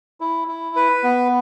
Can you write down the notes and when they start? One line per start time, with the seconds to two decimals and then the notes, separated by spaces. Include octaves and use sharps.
0.21 E4
0.48 E4
0.76 B4
1.03 B3